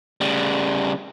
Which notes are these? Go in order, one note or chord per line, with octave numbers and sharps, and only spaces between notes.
C#3 G3